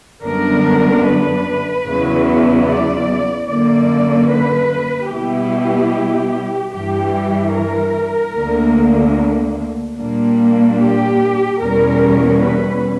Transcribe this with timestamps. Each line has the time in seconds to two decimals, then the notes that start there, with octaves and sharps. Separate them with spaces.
0.24 F#2 D3 G3 B3 D4 A#4
1.05 B4
1.86 E2 C#3 F#3 B3 E4
2.67 D5
3.48 F#2 D3 A#3 D5
4.30 B4
5.10 B2 G3 B3 E4 G4
6.72 G2 E3 G3 G4
7.54 A#4
8.35 D2 D3 A#3
9.97 A#2 G3 A#3 D4
10.79 G4
11.59 E2 B2 G3 C#4 A#4
12.40 B4